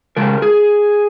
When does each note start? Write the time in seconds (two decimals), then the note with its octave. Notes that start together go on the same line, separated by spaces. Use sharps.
0.17 C#3 G#3 A#4
0.42 G#4